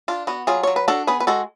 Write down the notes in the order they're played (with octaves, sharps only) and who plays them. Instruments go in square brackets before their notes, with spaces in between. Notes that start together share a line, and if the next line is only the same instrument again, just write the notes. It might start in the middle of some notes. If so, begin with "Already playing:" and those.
[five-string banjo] D4 F4
B3 F#4
F#3 F4 G#4
F#3 C#5
B4
D4 F#4 A4
B3 G#4 B4
B4
G#3 F#4 A4